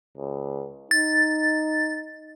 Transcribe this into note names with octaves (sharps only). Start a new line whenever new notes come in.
C#2
D#4 A6